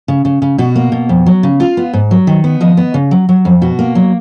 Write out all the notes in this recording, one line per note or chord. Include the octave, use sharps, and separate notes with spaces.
C#3
C#3
C#3
B2 F#4
A#3
B2
F2
F#3
C#3
F4 F5
B3
G#2
F#3
D#3
B3
F3 D#5
B3
C#3
F#3
F#3
F2
B2 F#4
A#3
F#3